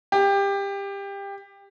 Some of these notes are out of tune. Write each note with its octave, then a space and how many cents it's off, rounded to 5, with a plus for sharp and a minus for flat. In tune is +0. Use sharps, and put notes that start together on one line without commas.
G4 +20